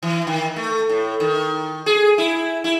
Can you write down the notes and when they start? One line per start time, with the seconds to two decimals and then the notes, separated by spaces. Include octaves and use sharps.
0.03 E3
0.27 D#3
0.56 A3
0.89 A2
1.20 D#3
1.86 G#4
2.18 E4
2.64 E4